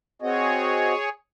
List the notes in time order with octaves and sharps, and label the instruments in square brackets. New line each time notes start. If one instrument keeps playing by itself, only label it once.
[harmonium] C4 F#4 D#5 [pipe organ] G#4 C#5